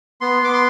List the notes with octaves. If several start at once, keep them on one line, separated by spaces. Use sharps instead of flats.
B3 C6
B3 D6
C6